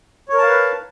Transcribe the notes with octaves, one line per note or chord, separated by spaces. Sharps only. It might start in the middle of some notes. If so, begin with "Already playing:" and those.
A#4 B4 C#5 F5 A5